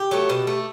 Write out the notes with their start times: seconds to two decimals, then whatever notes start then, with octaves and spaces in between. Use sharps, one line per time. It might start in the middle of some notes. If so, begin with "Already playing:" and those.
Already playing: G4
0.11 F#3 A3
0.29 B2
0.47 A3